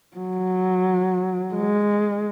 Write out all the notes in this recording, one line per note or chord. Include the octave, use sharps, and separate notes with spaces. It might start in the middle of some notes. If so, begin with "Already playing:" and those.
F#3
G#3